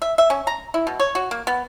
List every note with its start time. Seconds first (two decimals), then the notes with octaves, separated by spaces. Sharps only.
0.02 E5
0.18 E5
0.30 C#4
0.47 A#5
0.74 E4
0.87 B2
1.00 C#5
1.15 F#4
1.31 A#3
1.47 B3